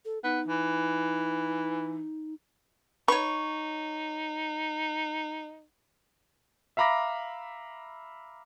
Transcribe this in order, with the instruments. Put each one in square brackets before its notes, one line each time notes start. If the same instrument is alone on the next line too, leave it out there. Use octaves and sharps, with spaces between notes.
[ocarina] A4
[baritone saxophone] B3 [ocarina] D#4
[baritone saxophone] E3
[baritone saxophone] D#4 [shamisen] B4 [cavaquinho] C#5 C#6
[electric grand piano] E5 F5 A#5 B5 D6 A#6